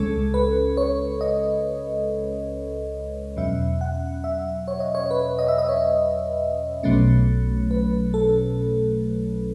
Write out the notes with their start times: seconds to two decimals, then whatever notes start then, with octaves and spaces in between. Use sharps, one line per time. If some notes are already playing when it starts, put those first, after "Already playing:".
Already playing: C#2 C#3 G#3 C#4 A4
0.34 B4
0.77 C#5
1.21 D#5
3.37 E2 B2 F#3 C#4 E5
3.81 F#5
4.24 E5
4.68 C#5
4.80 D#5
4.95 C#5
5.11 B4
5.39 D#5
5.48 E5
5.58 D#5
5.69 C#5
6.83 B1 B2 F#3 A3 C#4
7.71 B4
8.14 A4